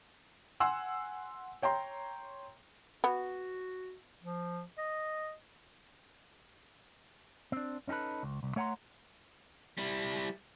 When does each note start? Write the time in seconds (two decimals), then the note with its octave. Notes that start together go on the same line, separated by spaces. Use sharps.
0.60 F#5 G#5 C6 E6
1.62 C#5 G5 A#5 C6
3.04 B3 F#4
4.23 F3
4.78 D#5
7.52 C4 D4
7.88 C#4 D#4 G4 A4 B4
8.23 C#2
8.43 C2
8.56 A3 C#5 F#5 A5 A#5 C6
9.78 G3 E4